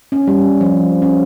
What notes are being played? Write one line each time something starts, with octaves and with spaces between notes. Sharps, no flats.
C#4
G3
F3
C#4